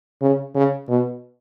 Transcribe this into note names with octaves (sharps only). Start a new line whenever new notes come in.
C#3
C#3
B2